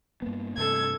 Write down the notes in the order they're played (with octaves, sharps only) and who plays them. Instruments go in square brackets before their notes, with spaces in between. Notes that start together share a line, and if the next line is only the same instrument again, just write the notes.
[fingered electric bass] G2 A#3 B3
[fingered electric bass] G2 C3 A3 [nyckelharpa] A4 [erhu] G#6